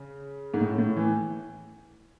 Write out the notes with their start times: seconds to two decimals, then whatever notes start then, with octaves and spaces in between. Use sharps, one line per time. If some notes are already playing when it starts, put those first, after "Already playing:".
Already playing: C#3
0.54 G#2
0.61 A2
0.78 A2
0.96 E3